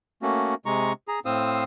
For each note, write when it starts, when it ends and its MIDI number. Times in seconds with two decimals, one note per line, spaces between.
0.22 0.55 57
0.22 0.55 58
0.22 0.55 61
0.22 0.55 66
0.66 0.93 48
0.66 0.93 56
0.66 0.93 82
0.66 0.93 85
1.08 1.20 68
1.08 1.20 82
1.26 1.64 45
1.26 1.64 60
1.26 1.64 72
1.26 1.64 77
1.26 1.64 87
1.26 1.64 88